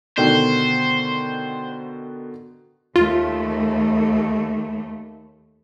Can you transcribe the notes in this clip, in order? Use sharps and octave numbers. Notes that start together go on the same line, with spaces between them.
B2 D3 D#3 C5
D#2 A3 F4